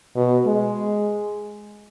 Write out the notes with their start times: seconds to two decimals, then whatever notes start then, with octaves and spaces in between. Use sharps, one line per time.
0.16 B2
0.46 G#3